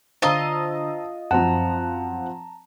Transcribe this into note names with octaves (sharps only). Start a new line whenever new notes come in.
D3 D4 F4 C5 D#5 A5 A#5 E6
F#2 F3 F#3 C4 F#5 A5 A#5